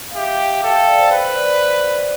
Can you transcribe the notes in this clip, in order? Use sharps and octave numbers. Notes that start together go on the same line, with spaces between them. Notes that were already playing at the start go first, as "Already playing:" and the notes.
F5
G4 E5
G5
A4 F5
F5
D5
C5
B4 C5
D5